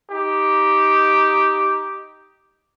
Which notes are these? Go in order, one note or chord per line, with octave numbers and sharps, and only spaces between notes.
D#4 G4